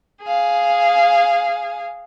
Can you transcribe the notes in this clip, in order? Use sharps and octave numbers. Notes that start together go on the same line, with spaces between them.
G#4 F5